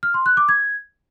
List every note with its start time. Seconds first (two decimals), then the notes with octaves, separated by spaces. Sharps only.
0.03 F6
0.14 C6
0.26 F#6
0.37 D6
0.49 G#6